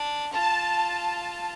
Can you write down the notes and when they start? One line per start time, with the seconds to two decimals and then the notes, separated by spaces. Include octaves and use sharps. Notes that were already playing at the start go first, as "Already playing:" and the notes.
Already playing: D4
0.32 F4 A5